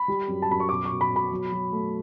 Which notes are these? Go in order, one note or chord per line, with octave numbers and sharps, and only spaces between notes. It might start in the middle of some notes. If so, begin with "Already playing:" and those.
Already playing: B5
G3
F#2
A5
F#2 B5
C#6
B2 D6
B2 C#6
B5
B2
B5
F#3
F#3
A3